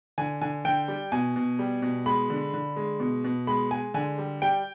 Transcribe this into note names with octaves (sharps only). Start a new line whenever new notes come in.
D3 G#5
D3 G#5
D3 G5
G3
B2 G#5
B2
G3
B2
G#3 B5
D3
D3
G#3
B2
B2
G#3 B5
G#3 G#5
D3 G#5
G3
G3 G5